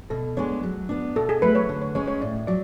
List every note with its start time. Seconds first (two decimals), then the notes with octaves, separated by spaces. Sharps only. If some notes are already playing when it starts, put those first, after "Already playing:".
0.10 B2 A4
0.37 G#3 B3 D4 C#5
0.63 F#3
0.89 B3 D4
1.16 B2 A4
1.29 G#4
1.42 F#3 A3 B4
1.55 C#5
1.69 D3
1.82 C#5
1.95 G#3 C#4 C#5
2.08 C#5
2.21 A2 D5
2.47 F#3 D5